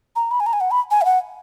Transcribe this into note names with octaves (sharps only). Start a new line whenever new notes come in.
A#5
B5
G#5
A#5
G#5
F#5
B5
G#5
E5
F#5